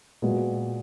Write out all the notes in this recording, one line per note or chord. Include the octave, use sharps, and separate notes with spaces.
A#2 G#3 B3 F#4